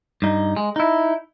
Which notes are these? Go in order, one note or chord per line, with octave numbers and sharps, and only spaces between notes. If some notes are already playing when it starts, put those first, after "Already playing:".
G2 D#4
G#3
D#4 E4